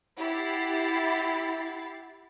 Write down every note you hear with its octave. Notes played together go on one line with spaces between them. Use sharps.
E4 G4 F#5 A6 C7